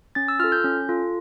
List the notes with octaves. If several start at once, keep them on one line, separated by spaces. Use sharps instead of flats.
C#4 A6
E6
F4 A4 F6
G6
C#4
F4 A4